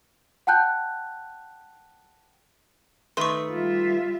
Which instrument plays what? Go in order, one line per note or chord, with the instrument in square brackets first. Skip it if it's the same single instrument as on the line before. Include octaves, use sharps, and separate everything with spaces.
[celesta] F#5 G5 A5 F#6 G6
[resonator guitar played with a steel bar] D#3 A3 B4 [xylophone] C6 C#6
[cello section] G3 F4 E5